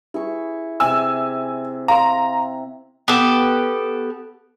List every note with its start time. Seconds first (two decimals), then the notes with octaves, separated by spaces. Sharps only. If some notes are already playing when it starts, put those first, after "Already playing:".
0.14 E4 G4 G#4 C#6
0.80 C3 G#4 G#5 E6
1.88 F5 A#5 C6
3.08 B3 G4 A4